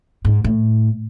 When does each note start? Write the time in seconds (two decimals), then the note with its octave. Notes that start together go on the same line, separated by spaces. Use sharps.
0.25 G#2
0.44 A2